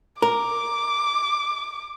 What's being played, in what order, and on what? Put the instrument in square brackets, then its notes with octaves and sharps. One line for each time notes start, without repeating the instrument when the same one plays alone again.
[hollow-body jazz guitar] A#4 [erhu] D6